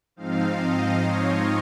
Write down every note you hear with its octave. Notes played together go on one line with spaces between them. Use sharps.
G#2 F3 C4 D#4 F5
D#5
C#5